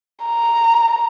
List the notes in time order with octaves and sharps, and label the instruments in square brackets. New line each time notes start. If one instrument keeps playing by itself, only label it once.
[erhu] A#5